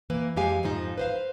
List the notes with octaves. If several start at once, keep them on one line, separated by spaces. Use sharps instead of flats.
E3 A#3 B4
F2 G#3 G4 F5 G#5
F2 G#2 F3 D#4
B4 C5 F5